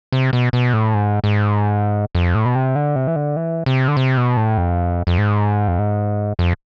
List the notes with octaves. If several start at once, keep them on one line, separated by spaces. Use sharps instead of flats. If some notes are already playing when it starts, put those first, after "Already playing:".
C3
B2
B2
A2
G#2
G#2
F2
A2
B2
C3
D3
C3
E3
D3
E3
C3
D3
C3
B2
A2
F2
F2
G#2
F2
G#2
F2